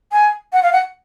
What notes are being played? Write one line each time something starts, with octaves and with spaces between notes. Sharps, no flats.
G#5
F#5
F5
F#5